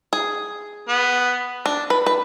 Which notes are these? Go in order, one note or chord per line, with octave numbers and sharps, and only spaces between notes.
G#4
B3
D4
B4
B4